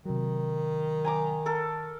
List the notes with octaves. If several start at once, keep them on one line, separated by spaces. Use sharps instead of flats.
C3 D#3 F#3
G#5 A#5 D6
A4 A#4